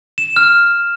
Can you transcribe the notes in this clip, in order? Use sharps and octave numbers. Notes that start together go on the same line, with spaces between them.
E7
F6